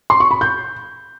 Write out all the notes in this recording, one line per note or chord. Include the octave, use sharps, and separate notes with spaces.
C6
C#6
B5
G6